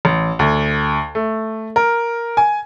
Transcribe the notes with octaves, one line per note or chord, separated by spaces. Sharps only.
A1
D2
A3
A#4
G#5